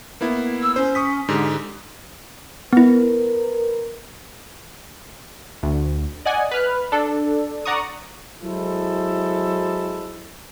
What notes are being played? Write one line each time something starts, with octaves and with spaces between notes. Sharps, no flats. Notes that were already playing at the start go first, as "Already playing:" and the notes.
A#3 B3 E4
E6
C#4 C5
C#6 D#6 B6
G#2 D3 G4
B3 E4 A#4 B4
D2
D5 D#5 F#5 G#5
B4 F6 F#6
D4 A4
D5 F#5 A#5 C#6 D#6
F#3 G#3 E4 A4 C5